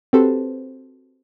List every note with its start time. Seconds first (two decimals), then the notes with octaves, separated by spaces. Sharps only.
0.13 C4 F#4 G4 A4 B4 C5